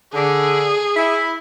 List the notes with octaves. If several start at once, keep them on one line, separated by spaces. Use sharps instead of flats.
D3 G#4
E4